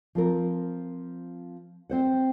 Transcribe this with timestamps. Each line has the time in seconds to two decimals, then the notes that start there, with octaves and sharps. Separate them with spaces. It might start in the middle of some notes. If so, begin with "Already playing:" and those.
0.15 F3 C4 A#4
1.90 C4 C5 F#5